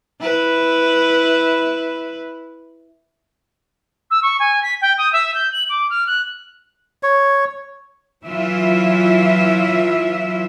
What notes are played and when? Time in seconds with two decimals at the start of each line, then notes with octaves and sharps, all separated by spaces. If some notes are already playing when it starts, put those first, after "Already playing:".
0.21 E4 B4
4.10 E6
4.22 C#6
4.39 G#5
4.62 B6
4.81 G5
4.97 D#6
5.12 E5
5.34 G6
5.52 F#7
5.69 D6
5.90 F6
6.06 F#6
7.03 C#5
8.25 E3 F#3 E4 F4 E5